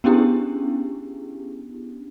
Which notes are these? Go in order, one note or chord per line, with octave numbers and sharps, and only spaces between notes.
B3 C#4 D4 E4 G4 G#4